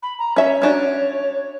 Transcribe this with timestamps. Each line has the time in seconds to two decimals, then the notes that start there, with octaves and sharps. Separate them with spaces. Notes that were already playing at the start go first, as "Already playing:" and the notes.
0.02 B5
0.18 A#5
0.36 C#4 C#5 E5
0.62 C#4 D4 F#4